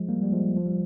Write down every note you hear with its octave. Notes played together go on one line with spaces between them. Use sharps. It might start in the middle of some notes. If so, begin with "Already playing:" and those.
Already playing: F3 G#3
G3 A#3
G3
F3 G#3
F3
G3